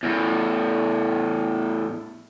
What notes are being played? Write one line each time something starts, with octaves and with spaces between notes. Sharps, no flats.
E2 A2